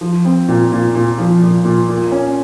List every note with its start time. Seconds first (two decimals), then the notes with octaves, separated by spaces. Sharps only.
0.01 F3
0.25 C4
0.48 A#2
0.72 A#2
0.95 A#2
1.18 F3
1.42 A#2
1.65 A#2
1.89 A#2
2.12 C#4